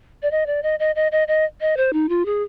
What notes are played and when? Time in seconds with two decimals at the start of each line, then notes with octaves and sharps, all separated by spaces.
0.22 D5
0.31 D#5
0.46 D5
0.63 D#5
0.79 D#5
0.95 D#5
1.12 D#5
1.28 D#5
1.61 D#5
1.77 C5
1.93 D#4
2.09 F4
2.25 G#4